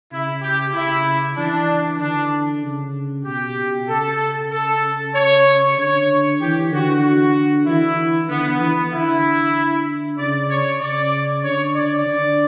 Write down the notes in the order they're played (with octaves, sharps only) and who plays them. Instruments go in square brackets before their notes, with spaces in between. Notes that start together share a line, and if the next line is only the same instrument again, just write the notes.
[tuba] C#3 [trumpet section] E4
[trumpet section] G4
[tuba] C#3 [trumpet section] E4
[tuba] E3 [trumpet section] D4
[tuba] D3 [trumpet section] D4
[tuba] C#3
[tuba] B2 [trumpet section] G4
[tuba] B2
[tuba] C#3 [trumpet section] A4
[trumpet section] A4
C#5
[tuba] D3 [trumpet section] C#5
[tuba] E3 [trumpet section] G4
[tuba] D3 [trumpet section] F#4
[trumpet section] F#4
[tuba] E3 [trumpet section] E4
[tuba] D3 [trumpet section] B3
[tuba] E3 [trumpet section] B3
[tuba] D3 [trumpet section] E4
[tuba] C#3 [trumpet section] D5
[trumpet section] C#5
[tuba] C#3 [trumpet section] D5
[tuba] D3 [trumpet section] C#5
[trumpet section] D5
[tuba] D3